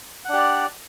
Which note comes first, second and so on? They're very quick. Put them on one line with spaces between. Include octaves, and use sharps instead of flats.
F#5 D4 G4 D5